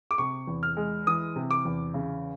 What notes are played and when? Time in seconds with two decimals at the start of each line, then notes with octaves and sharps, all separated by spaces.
0.11 D6
0.18 C3 C#6
0.47 E2
0.63 F6
0.77 G#3
1.07 E3 D#6
1.36 C3
1.51 D6
1.65 E2
1.94 C#3